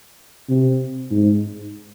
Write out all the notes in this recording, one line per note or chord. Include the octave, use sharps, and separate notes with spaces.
C3
G#2